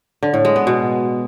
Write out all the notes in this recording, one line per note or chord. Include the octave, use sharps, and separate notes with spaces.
D3
A2
G#3
B3
B2